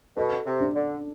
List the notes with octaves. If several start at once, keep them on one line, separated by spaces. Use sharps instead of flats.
B2 A4
C3
D4
D3